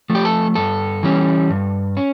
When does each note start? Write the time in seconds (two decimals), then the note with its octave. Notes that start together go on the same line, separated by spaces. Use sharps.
0.10 F3 A3
0.15 G4
0.25 A4
0.55 G2 A4
1.03 E3 G3 C#4
1.50 G2
1.97 C#4